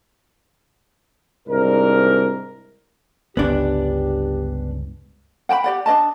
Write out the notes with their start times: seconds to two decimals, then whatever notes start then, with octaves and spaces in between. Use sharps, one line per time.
1.48 C2 G#2 D4 D#4 A#4
3.37 G1 C#2 B3 D4 G4
5.49 F#5 G5 A5 B5
5.64 G4 D5 F#5
5.86 D4 D5 D#5 A5